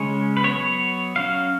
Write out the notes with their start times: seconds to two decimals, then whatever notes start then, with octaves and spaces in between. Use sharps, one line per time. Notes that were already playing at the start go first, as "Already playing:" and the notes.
Already playing: C#3 G#3 C#4 C#5
0.37 B4
0.44 F#3 B3 C#5
1.16 F#3 C#4 F5